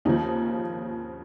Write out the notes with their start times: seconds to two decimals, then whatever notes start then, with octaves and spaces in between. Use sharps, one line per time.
0.05 D#2 C#3 F3 D#4